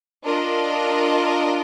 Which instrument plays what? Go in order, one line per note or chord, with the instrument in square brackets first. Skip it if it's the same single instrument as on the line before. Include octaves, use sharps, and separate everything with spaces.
[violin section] D4 F4 A#4 D#5